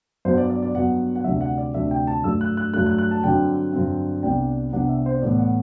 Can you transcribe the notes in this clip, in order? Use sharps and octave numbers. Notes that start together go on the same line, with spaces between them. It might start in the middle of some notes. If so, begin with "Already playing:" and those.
G2 F#3 B3 C5
D5
D5
D5
G2 F#3 B3 F#5
F#5
D2 C3 G3 D4 E5
F#5
D5
D2 C3 G3 D4 E5
G5
A5
G2 F#3 A3 E6
F#6
F#6
G2 F#3 A3 F#6
F#6
F#6
A5
G2 D3 F#3 C4 G5
G2 D3 F#3 C4
C2 C3 G3 B3 D4 G5
C2 C3 G3 B3 D4 F#5
E5
C5
A2 E3 B3 D5
F#5